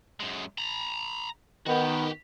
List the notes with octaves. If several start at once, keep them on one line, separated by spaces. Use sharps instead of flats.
F#2 G#3
A#5 B5
D#3 B3 F#4 G4